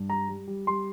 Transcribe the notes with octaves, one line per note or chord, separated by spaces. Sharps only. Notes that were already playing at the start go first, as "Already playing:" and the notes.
Already playing: G2
G3 A#5
G3
G3
G3 C6